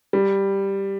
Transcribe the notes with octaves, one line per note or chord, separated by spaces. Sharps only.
G3